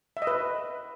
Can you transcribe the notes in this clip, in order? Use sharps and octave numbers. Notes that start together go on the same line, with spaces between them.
E5
D#5
B4